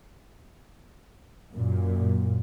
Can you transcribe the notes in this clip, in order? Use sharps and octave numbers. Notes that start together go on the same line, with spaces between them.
F#2 A#2